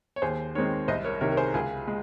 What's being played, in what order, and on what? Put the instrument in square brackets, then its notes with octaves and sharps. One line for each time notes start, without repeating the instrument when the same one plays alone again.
[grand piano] C#5
D#2 G#4 C5
D#3 G#3 C4 A#4 C#5
C2 C5 D#5
A#4 C#5
C3 D#3 A#4 C#5
A#4
G#4 C5
C#2 F4 G#4
G#3